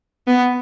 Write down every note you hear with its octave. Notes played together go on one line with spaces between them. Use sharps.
B3